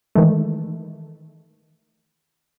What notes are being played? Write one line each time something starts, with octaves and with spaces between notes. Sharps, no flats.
D#3 E3 G#3 A3